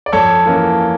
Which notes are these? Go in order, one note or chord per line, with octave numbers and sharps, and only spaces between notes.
D5
F2 A4 C#5
E3 A#3 C#4